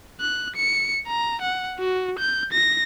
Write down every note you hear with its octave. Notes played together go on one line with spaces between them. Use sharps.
F#6
C#7
A#5
F#5
F#4
G6
A#6